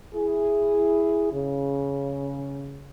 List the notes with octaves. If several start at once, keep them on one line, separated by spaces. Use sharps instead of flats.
E4 G#4
C#3